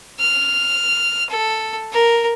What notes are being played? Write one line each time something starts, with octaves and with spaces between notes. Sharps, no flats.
F6
A4
A#4